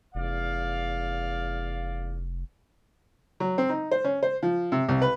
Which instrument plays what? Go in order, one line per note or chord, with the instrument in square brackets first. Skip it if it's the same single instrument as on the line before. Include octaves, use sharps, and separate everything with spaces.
[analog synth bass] F1 [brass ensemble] E2 D5 F5
[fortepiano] F#3
C4
D#4
C5
C#4
C5
F3
C3
C2
B4